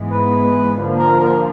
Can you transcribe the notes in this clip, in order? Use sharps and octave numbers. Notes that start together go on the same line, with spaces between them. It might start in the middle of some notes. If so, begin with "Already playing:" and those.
Already playing: G#2 E3 G#3 B3
B4
D3 F3 A#3
A#4
A#4